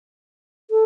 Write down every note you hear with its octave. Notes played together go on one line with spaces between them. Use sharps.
A4